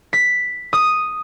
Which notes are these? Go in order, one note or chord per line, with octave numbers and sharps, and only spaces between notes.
B6
D#6